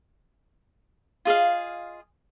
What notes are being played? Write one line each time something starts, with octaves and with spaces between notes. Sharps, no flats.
F4 G#4 D#5 F5